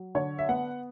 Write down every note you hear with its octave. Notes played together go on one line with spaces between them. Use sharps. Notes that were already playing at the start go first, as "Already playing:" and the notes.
Already playing: F#3
D3 C#5
E5
B3 F#5